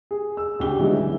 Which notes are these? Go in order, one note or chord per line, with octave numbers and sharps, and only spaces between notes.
G#4
E6
D2 C#3 G4 G7
E3 F#3 G#3 B3 D4 D#4
E4